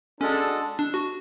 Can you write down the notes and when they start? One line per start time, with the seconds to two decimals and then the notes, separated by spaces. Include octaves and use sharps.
0.21 G#3 C#4 D4 F#4 A4
0.79 D4
0.94 F#4